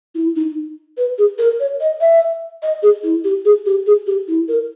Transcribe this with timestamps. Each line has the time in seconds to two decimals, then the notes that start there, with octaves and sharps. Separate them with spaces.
0.15 E4
0.36 D#4
0.97 B4
1.18 G#4
1.38 A#4
1.60 C#5
1.80 D#5
2.01 E5
2.62 D#5
2.83 G#4
3.03 E4
3.24 G4
3.45 G#4
3.66 G4
3.86 G#4
4.07 G4
4.28 E4
4.48 A#4